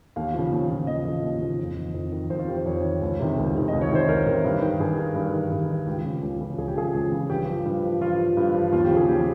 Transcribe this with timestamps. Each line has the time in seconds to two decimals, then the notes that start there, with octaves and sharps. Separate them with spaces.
0.16 D#2 F5
0.34 C#3 F3
0.52 D#2
0.70 C#3 F3
0.87 D#2 D#5
1.05 C#3 F3
1.23 D#2
1.41 C#3 F3
1.59 F2
1.76 D#3
1.94 F2
2.12 D#3
2.30 F2 C5
2.39 F4
2.48 D#3 G4
2.57 C5
2.66 F2 C#5
2.84 D#3
3.02 C#2
3.20 C3 D#3
3.37 C#2
3.55 C3 D#3
3.68 C#2 D#5
3.81 C#5
3.91 C3 D#3 C5
4.09 C#2 A#4
4.26 C3 D#3
4.45 G2
4.62 D#3
4.80 G2 G#4
4.98 D#3
5.16 G2
5.34 D#3
5.52 G2
5.69 D#3
5.87 C#2 G4
6.05 C#3 F3
6.23 C#2
6.41 C#3 F3
6.58 C#2 G#4
6.68 G4
6.77 C#3 F3 G#4
6.94 C#2
7.12 C#3 F3
7.30 G2 G4
7.48 F3
7.65 G2
7.84 F3
8.01 G2 F4
8.19 F3
8.37 G2
8.55 F3
8.72 D#2 F4
8.85 G4
8.91 C#3 F3
8.97 G#4
9.08 D#2 G4